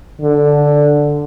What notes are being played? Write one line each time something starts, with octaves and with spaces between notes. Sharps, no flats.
D3